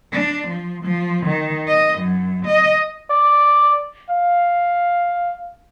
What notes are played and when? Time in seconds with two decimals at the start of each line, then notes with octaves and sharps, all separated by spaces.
0.12 D4
0.48 F3
0.84 F3
1.26 D#3
1.67 D#5
1.98 F#2
2.45 D#5
3.10 D5
4.10 F5